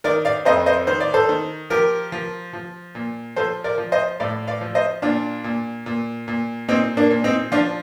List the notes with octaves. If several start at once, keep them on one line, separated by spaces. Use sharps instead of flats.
D#3 A#4 D5
D5 F5
F2 C5 D#5
C5 D#5
D#3 C5
D5
A4 C5
D#3
F3 G4 A#4
F3
F3
A#2
F3 A4 C5
A#4 D5
F3
C5 D#5
A2 D5 F5
D5 F5
F3
C5 D#5
A#2 D4 F4
A#2
A#2
A#2
A#2 C4 D#4
A#3 D4
A#2
C4 D#4
F3 D4 F4